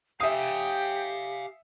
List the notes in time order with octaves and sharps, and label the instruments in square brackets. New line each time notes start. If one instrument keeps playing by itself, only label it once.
[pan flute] G4 [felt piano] E5 D#6 [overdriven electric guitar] F5 G#5 [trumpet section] G5